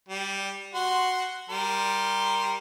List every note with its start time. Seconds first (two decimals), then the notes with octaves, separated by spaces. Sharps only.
0.09 G3
0.74 F#4 C6
1.50 G3 A#4 C6